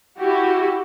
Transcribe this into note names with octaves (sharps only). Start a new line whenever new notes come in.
E4 F#4 G4